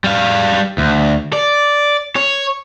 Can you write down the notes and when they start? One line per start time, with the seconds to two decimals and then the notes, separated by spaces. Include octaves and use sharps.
0.04 G3 F5
0.78 D2
1.33 D5
2.16 C#5